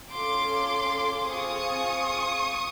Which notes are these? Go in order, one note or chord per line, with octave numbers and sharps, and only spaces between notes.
C#4 F4 A4 C6 D6
C4 F4 G#4 C#6 D#6